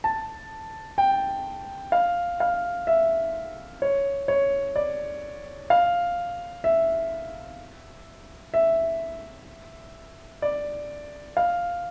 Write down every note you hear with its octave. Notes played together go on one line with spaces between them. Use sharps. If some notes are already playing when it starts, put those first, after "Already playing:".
A5
G5
F5
F5
E5
C#5
C#5
D5
F5
E5
E5
D5
F5